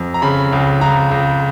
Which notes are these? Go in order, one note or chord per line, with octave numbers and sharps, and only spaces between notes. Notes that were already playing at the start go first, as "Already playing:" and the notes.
Already playing: F2
A#5
C#3 B5
C#2
C#2 A#5
C#2